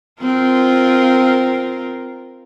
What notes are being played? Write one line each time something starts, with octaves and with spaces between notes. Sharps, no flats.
C4 F4 A#4